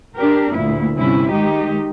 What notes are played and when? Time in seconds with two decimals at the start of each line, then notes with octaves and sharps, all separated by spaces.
0.16 D4 G4 A#4
0.54 D2 A#2 E4
0.96 G2 C3 C#4 E4
1.30 D#3 G#3 D#4 G4